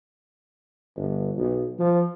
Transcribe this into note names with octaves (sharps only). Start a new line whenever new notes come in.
G1
B1
F3